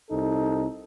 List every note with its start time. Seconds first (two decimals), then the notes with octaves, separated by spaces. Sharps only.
0.10 C2 D#4 A4